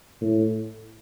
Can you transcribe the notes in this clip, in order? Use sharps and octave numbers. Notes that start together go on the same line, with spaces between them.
A2